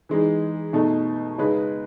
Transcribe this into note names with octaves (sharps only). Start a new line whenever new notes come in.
E3 G#3 D#4
B2 A3 D#4
C#3 G#3 D#4 G#4 B4